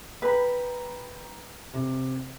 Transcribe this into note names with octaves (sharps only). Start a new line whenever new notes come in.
B4 G5 A#5 B5
C3